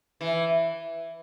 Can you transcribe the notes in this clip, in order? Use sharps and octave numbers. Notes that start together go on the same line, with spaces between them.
E3